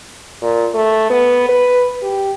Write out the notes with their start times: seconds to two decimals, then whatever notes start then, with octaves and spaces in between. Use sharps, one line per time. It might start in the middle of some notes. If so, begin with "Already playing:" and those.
0.42 A#2
0.74 A3
1.10 B3
1.49 B4
2.02 G4